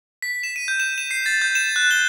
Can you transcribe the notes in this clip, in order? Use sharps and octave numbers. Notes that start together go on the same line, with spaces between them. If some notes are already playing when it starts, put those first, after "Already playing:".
B6
E7
D#7
G6
E7
E7
C7
A6
G6
E7
F#6
G7